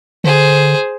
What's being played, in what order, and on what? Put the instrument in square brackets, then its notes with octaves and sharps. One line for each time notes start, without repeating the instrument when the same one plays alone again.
[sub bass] D3 [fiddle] G#4 C5